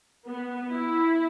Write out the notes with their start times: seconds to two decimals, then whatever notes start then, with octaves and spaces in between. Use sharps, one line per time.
0.28 B3
0.71 E4